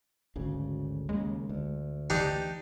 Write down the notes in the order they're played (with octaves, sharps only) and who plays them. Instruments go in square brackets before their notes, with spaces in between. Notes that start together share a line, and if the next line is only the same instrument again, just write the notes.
[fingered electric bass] G#1 D2 C#3
[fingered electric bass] D#2 C#3 [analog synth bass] G#3
[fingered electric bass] D2
[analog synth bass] E3 [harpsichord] D4 D#4 G4